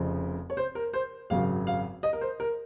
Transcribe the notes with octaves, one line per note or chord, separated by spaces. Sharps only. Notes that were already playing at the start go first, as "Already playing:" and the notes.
Already playing: F1 F2 C#3 F3
C#5
C5
A#4
C5
G#1 F#2 C#3 F#3 F5
F5
D#5
A#4
C5
A#4